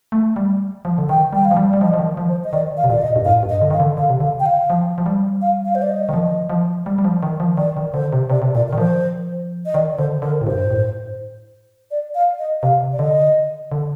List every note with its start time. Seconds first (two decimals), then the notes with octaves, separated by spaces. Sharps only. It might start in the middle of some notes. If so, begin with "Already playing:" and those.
0.12 A3
0.36 G3
0.85 F3
0.98 D3
1.09 D#3 G5
1.33 G3 G5
1.45 F5
1.51 F3
1.57 G3
1.70 G3 D5
1.81 F3 D#5
1.94 F3
1.99 D#3
2.17 F3
2.29 C5
2.44 D#5
2.53 D#3 D5
2.77 F5
2.84 C3
2.90 A#2 D5
3.01 D#5
3.16 G2
3.25 A2 F5
3.43 G2
3.49 D#5
3.61 D3
3.70 D#3 F5
3.80 D3
3.97 D3 F5
4.09 C3
4.20 D3 F5
4.40 G5
4.46 F5
4.70 F3
4.98 F3
5.06 G3
5.42 F5
5.65 F5
5.75 C5
5.82 D5
5.89 D#5
6.09 D#3
6.14 F3
6.50 F3
6.86 G3
6.98 G3
7.04 F3
7.23 D#3
7.40 F3
7.57 D#3 D5
7.77 D#3
7.94 D3 C5
8.13 C3
8.30 C3 D5
8.42 C3
8.55 A#2 D5
8.68 D#3 A#4
8.78 F3 C5
9.66 D#5
9.74 D#3 D5
9.98 D3 C5
10.22 D3 A#4
10.41 A2
10.47 G2 C5
10.71 A2
11.91 D5
12.15 F5
12.39 D#5
12.63 C3 F5
12.93 D5
12.99 D3 D#5
13.72 D3